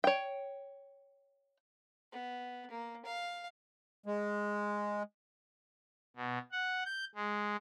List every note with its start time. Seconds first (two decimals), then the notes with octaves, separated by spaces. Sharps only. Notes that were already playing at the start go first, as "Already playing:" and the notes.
0.04 C#5 G5
2.12 B3
2.71 A#3
3.05 F5
4.06 G#3
6.16 B2
6.52 F#5
6.85 G6
7.15 G#3